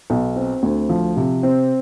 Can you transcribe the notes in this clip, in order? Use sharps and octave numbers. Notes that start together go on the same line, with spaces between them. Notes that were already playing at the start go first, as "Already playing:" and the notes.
B1
C4
D2
F3
C3
C4